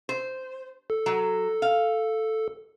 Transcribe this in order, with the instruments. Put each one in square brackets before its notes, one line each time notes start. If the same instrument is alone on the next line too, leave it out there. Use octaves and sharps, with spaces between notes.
[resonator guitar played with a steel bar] C5
[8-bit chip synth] A4
[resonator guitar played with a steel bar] F#3
F5